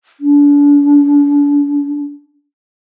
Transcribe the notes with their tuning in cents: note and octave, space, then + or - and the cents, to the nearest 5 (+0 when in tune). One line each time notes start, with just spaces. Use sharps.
D4 -35